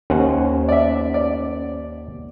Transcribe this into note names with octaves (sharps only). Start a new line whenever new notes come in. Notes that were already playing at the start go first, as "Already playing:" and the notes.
D#2 C#4 C5 F#5
D5 E5
D5